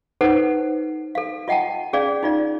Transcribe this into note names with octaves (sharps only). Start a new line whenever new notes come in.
D#4 A4 B4 C5 F#5
A4 F5
F4 D#5 F#5 G5 A5
C#4 G#4 D5 F5
D#4 F4 D5